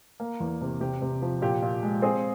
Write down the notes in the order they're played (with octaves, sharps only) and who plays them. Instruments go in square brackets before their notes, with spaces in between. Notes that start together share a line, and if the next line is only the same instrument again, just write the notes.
[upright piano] A#3
E2
C3
C3 G4
C3
F3
A#2 G4
A#2
G#3
C4 G#4